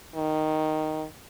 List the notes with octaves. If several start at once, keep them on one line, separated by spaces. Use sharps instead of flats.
D#3